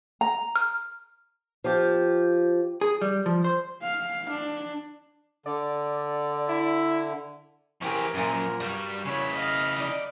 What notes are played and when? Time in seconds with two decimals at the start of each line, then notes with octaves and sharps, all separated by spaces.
0.21 A#5
0.56 F6
1.64 F3 G4
2.81 G#4
3.02 G3
3.26 F3
3.44 C5
3.83 F5
4.30 D4
5.46 D3 D5
6.49 E4
7.82 E3 C4 G4 G#4 A#4 C#5
8.15 F#2 A#2 F3 G#5
8.60 G2 G3 F#4
9.05 C#3 E4 C#5
9.35 D#5 F5
9.76 D#4 D5